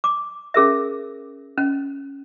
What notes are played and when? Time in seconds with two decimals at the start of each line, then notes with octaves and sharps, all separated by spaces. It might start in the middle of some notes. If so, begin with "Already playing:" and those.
0.04 D6
0.54 C#4 G#4 A#4 E5
1.58 C#4